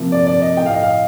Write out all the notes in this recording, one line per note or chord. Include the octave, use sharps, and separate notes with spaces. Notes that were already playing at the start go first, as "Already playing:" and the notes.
Already playing: C3 F3 A#3
D5
D5
D#5
A2 A3 G5
F5
D#5
F5